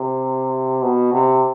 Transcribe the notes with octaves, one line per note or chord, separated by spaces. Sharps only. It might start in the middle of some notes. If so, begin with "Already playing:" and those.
Already playing: C3
B2
C3